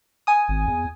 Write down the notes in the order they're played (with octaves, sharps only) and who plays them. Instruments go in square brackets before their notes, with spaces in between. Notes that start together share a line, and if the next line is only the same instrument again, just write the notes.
[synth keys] G#5 D#6
[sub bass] G#1
E2